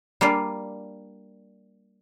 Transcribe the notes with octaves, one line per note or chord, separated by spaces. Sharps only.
G3 A#3 D4 F4